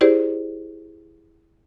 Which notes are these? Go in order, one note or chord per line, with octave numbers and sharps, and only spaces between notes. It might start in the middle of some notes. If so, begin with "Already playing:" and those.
E4 G4 G#4 C5 D5